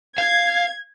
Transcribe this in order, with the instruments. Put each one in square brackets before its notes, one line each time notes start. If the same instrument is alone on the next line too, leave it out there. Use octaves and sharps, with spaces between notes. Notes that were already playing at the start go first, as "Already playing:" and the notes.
[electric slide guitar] F5 [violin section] G#6